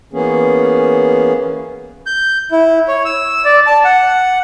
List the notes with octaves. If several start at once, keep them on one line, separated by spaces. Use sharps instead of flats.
E3 A#3 B3 C#4 G#4
G6
E4
C#5
E6
D5
A5
F#5